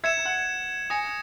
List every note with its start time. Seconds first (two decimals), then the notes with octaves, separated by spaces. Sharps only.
0.04 E5 G#6 C#7 E7
0.25 F#5
0.90 G#5 D#6 A#6 C#7